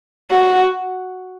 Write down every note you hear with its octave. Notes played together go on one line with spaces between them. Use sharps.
F#4